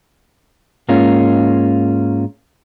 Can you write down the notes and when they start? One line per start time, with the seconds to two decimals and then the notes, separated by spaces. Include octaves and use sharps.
0.88 G#2 A#3 C#4 F4